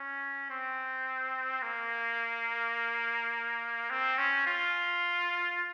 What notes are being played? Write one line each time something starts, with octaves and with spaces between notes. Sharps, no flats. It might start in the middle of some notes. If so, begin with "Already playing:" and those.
Already playing: C#4
C4
A#3
C4
C#4
F4